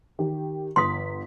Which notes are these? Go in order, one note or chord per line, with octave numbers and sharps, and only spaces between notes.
D#3 G4
G1 C6 D#6 B6